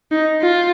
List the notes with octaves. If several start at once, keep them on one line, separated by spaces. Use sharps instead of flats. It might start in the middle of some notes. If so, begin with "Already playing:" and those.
D#4
F4